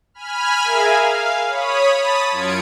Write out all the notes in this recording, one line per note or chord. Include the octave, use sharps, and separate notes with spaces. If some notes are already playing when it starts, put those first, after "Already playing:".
G#5 B5 F6
G#4 A#4 E5 F5 G#5
F5
C#5 B5 D#6
A5 B5 D#6 A6 B6
F#2 F4 G#6 C#7 D7